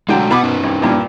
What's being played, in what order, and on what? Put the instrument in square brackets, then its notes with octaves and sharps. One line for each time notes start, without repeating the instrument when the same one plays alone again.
[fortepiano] D3 F#3 G5 [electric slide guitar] G#3 A3 D4
[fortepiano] B2 B5 D6 [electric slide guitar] B4 F#5
[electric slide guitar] C#4 D#4 B4
[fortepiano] C2
C2 G2 A#2